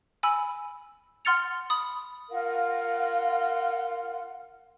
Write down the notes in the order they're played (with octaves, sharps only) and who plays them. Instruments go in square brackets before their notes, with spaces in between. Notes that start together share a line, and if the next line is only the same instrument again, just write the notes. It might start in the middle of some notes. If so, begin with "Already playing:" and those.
[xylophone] G#5 B5 E6
F#5 C6 F6 A6 C#7 F7
B5 D#6
[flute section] F4 A#4 F5 F#5